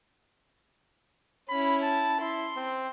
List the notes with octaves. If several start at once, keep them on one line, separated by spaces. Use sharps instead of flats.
C#4 E4 B5
A5
E4 C6
C4